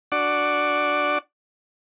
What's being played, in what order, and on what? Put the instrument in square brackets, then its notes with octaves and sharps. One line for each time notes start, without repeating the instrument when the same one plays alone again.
[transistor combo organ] D4 F#4 D5 F#5 C#6 D6